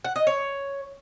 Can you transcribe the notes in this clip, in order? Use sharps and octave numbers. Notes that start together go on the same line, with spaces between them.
F#5
D#5
C#5